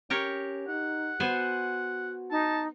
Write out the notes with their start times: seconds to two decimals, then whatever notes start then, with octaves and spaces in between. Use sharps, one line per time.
0.10 C#4 G4 A#4 C#5
0.68 D#4 F#5
1.20 B3 F#4 C5 G#5
2.31 D#4 A5